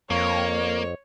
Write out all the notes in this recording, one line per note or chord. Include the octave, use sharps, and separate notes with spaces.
F2 A#3 C#5